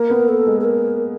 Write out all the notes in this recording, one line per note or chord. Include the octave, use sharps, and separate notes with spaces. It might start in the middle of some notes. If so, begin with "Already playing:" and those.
Already playing: A#3 A#4
B3
A4
G#3
A4
A#4